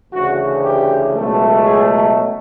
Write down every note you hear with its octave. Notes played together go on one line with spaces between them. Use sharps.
D2 C#3 E3 F#4
G4
C#2 B2 F#3 A3
G#4